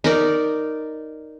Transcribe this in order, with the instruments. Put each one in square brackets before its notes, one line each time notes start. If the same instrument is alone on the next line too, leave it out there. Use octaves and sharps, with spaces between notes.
[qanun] D#4 A#4 D5